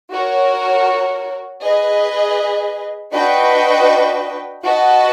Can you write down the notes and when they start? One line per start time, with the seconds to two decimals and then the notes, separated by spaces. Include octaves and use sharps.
0.12 F#4 A#4 C#5
1.63 G#4 B4 D#5
3.13 D4 F#4 B4 D#5 G5
4.64 F#4 B4 D#5 F#5 A5